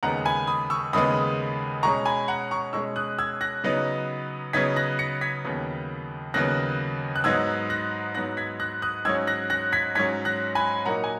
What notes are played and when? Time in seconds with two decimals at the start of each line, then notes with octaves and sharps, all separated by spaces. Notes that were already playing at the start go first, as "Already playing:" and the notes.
0.03 D#2 C#3 G#3 B3 F#5 A#5
0.25 G#5 B5
0.47 B5 D#6
0.70 C#6 E6
0.93 D#2 C#3 G#3 B3 B5 D#6
1.83 B2 G#3 C#4 A#5 C#6
2.06 G#5 B5
2.28 F#5 A#5
2.51 A#5 C#6
2.73 B2 G#3 C#4 C#6 E6
2.96 D#6 F#6
3.19 E6 G#6
3.41 F#6 A#6
3.64 C#3 F#3 B3 D#4
4.53 C#3 F#3 B3 D#4 G#6 B6
4.76 F#6 A#6
4.99 A#6 C#7
5.21 G#6 B6
5.44 D#2 C#3 F#3 B3
6.34 D#2 C#3 F#3 B3 F#6 A#6
7.16 F#6
7.24 G#2 F#3 B3 D#4 E6 G#6
7.70 F#6 A#6
8.14 G#2 F#3 B3 D#4 F#6 A#6
8.37 G#6 B6
8.60 F#6 A#6
8.82 D#6 F#6
9.05 G#2 F#3 C#4 E6 G#6
9.27 F#6 A#6
9.50 F#6 A#6
9.72 G#6 B6
9.95 G#2 F#3 C#4 G#6 B6
10.25 F#6 A#6
10.55 G#5 B5
10.85 A#2 F#3 A#3 D#4 F#5 A#5
11.04 G#5